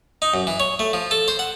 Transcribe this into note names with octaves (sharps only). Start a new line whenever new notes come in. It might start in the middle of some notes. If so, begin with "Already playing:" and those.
D#4
F#2
E3
C#5
A3
F3
A4
C5
F#5